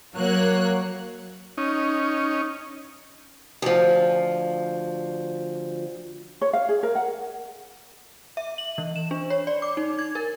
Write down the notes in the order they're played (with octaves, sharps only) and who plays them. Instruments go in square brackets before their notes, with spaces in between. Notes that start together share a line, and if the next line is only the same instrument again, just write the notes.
[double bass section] F#3 [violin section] A#3 C#5 F#6
[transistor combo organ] C#4 D#4
[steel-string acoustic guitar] D2 F3
[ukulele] C#5
F5
G#4
A#4
F#5
[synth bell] E5
F#7
E3
E7
D4
C#5
D5
D6
D#4
G#6
A#4